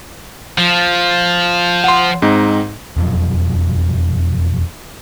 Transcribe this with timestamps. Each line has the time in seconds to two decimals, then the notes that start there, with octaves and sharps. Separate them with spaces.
0.58 F3
1.84 F#5 C6
2.22 G#2 C4 D#4
2.97 E1 F2 F3 F#3